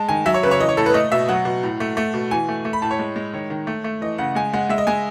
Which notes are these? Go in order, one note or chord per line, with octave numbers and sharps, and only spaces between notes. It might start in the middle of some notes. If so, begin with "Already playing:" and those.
Already playing: G#3 A5
D#3 G#5
F#3 E5
C#5
C#3 B4
C#5
E3 D#5
C#5
A2 A4
B4
A3 D#5
B2 E5
F#3 F#5
B2
A2
A3
A3
B2
E3 G#5
A3
A3
B5
A2 A5
C#5
G#3
G#3
D#3 C#5
D#3
A3
A3
E3 D#5
C#3 F#5
G#3 G#5
G#3 F#5
G#3 E5
D#5
G#3 G#5